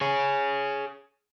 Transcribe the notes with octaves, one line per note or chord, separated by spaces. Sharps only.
G#4 C#5